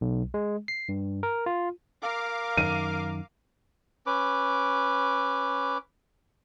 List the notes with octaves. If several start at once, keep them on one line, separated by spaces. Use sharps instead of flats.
B1
G#3
C7
G2
A#4
F4
A#4 F5 D6
F#2 D#3 D#7
C#4 B4 D6